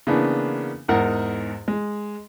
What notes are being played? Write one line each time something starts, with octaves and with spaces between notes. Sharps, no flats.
C#3 E3 A#3 B3 D4
E2 G#2 A#4 F#5
G#3